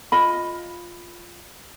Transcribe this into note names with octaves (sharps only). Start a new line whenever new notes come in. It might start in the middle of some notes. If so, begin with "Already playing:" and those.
F4 D#5 B5